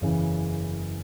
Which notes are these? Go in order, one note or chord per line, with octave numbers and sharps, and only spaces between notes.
F#1 E2 C#3 E3